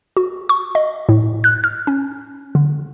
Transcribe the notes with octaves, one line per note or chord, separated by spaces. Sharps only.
F#4
C#6
D#5
A2
F#6
F6
C#4
D3